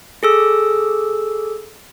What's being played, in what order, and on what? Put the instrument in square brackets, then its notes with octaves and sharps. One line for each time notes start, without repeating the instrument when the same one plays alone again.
[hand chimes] G#4 A4 E6